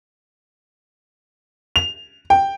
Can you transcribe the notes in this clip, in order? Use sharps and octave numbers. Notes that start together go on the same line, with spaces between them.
F7
G5